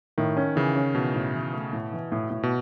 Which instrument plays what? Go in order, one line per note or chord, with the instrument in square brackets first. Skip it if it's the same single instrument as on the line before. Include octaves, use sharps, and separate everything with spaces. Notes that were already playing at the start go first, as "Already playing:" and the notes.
[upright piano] A2 [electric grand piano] D#3
[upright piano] C#4
[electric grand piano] C#3 [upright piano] E3
[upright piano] C#4
[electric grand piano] B2 [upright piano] E3
[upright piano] A2
E3
A3
A2
E3
A2
A2
[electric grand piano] B2